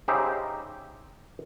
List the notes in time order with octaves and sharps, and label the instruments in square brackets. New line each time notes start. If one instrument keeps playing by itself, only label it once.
[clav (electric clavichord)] C#3 D#4 G4 C5 E5 A#5